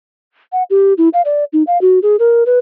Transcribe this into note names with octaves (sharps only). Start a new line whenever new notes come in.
F#5
G4
E4
F5
D5
D#4
F5
F#4
G#4
A#4
B4